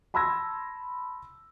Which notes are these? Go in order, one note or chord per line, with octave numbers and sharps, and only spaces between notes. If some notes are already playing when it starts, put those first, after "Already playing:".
A5 B5 C6 E6 G#6 A#6